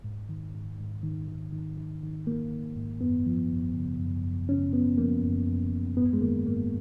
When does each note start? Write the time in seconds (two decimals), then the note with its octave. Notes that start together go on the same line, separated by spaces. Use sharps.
0.04 G#2
0.29 D#3
0.55 G#2
0.79 G#2
1.03 D#3
1.28 D#3
1.52 D#3
1.77 D#3
2.03 D#3
2.27 D#3 A#3
2.51 D#3
2.76 G#2
3.00 F#2 B3
3.26 F3
3.50 F#2
3.75 C#3
4.00 F#2
4.24 F#2
4.49 C#3 C#4
4.73 F#2 B3
4.98 F3 A#3
5.23 F#2
5.47 F#2
5.73 F#2
5.97 G#2 B3
6.13 G#3
6.22 D#3 A#3
6.46 G#2 A#3